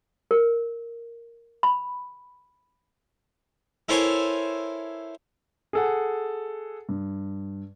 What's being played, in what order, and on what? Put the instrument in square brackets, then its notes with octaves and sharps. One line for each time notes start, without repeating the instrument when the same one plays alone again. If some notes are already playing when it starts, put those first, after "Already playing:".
[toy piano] A#4
B5
[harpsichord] E4 A4 A#4 C5 C#5 G#5
[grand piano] G#4 A4 F#5
G2